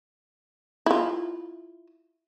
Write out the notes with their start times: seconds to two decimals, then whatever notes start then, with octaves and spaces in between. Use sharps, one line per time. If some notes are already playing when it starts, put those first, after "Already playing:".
0.86 E4 F4